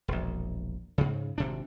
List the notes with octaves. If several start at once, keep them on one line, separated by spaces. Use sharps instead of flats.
E1 A#1
G#2 C#3
G#1 C3 D4